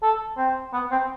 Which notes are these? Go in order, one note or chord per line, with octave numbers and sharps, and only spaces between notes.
A4
C4
B3
C4